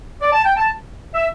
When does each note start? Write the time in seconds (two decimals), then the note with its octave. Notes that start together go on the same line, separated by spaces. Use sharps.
0.21 D5
0.33 A5
0.45 G5
0.57 A5
1.14 E5